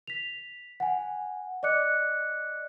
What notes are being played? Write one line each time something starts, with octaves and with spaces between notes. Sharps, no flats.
B6 F7
F#5 G#5
D5 D#5 D6 F#6 C#7